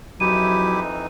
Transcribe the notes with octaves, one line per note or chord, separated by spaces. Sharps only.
F2 E3 F#3 D#4 E4 G4 D#7